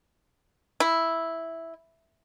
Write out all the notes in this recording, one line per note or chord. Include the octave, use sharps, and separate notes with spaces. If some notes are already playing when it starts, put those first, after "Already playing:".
E4